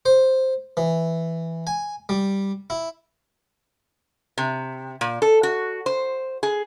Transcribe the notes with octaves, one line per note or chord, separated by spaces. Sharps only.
C5
E3
G#5
G3
E4
C3
A#2
A4
F#4
C5
G#4